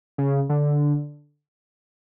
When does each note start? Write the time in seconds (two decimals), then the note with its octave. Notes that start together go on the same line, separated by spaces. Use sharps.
0.18 C#3
0.49 D3